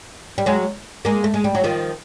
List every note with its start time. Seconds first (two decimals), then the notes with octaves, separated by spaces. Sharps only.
0.38 G3
0.46 F#3 G#3
1.05 G#3 A#3
1.24 A3
1.34 G#3
1.44 G3
1.55 F#3
1.64 D#3 F3